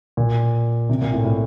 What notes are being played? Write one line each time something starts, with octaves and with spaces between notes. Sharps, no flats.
A#2
C3
A#2
A2
A2